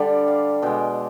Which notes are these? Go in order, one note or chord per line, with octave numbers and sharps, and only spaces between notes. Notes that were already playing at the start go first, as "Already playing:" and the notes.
Already playing: D3 G3 D5
F5
B2 G#3 G5